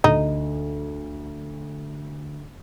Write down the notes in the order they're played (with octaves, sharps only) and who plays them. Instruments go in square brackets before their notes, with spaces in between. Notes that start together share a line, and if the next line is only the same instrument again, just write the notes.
[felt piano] D2 [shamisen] D#4